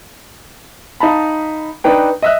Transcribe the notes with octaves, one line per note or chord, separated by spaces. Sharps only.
D#4 F5 A5 B5
D4 D#4 B4 G5
D#5 E5 F#6